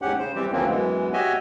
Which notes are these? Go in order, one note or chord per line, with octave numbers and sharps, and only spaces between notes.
E2 G#2 C#4 G4 F#5
C#3 C5
E3 G3 C4 G4
D2 E3 F3 A#3 C4 C#4
F#2 E3 G#3 B3
F#4 G4 C#5 D#5 E5 G#5